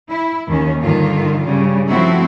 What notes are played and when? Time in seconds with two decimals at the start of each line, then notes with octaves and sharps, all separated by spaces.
0.10 E4
0.47 D#2 D#3 C#4
0.83 G2 D3 D#3 F4
1.46 G2 C#3 G3
1.88 F3 A3 C4 E4 F#4